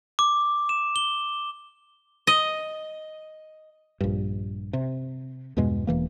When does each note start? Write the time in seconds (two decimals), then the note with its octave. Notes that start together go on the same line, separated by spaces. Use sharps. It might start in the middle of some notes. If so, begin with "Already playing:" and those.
0.19 D6
0.69 E7
0.96 G7
2.27 D#5
4.01 A#1 G2
4.73 C3
5.57 E2 G2 B2 G#3
5.87 E1 E3 A#3